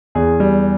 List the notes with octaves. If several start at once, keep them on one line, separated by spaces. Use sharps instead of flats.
E2 G#4
G3